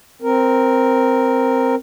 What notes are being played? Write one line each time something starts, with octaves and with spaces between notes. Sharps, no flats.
C4 A#4